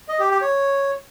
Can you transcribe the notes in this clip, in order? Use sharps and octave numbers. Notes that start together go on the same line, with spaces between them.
D#5
G4
G4
C#5